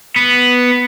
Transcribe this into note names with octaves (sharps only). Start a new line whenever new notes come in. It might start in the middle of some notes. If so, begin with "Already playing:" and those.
B3